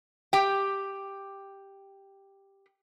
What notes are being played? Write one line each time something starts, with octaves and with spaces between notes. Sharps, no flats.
G4 G5